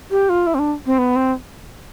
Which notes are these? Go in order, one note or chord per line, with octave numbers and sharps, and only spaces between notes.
G4
F4
E4
C4
D4
C4
B3
C4